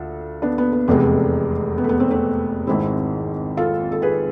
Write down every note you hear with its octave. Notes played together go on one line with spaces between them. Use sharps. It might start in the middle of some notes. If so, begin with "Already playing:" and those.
Already playing: D2 F4 A4
B3 D4
B3
B3
F1 E2 C3 G#3 A3
B3
A3
B3
A3 C4
A3 C4
G#1 G#2 G#3 C4 E4
F4 A4
A4
G#4 B4